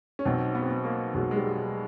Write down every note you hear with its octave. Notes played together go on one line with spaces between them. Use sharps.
C#4
B1 B2 F#3 C4
B3
C4
B3
A#3
B1 B2 F#3 G#3
G#3
G3